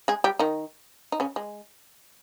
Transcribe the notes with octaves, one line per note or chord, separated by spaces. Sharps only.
G#3 G#4
G3 G4
D#3 D#4
D#4
C#3 C#4
G#3